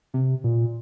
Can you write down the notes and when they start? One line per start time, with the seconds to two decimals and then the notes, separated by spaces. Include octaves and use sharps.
0.14 C3
0.44 A#2